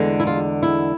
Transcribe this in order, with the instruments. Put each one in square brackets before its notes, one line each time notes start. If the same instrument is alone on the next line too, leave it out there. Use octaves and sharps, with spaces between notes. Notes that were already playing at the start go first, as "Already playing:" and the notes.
Already playing: [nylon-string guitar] E2 D3 G#3
E4
F4
E4